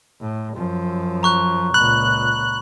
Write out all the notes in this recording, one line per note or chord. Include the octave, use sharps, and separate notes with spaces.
A2
F#2 F3
A#5 C#6 F#6
C#2 A#2 B5 F#6